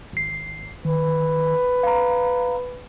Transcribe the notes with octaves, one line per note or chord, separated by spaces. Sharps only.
G#1 C7
D#3 B4
F5 A#5